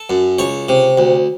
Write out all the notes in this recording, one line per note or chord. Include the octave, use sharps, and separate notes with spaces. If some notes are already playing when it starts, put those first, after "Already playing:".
Already playing: A4
F#2
C#2 C#5
C3
D2